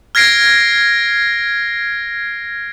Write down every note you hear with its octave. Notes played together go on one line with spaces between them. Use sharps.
F6 G#6 A#6 C7 D7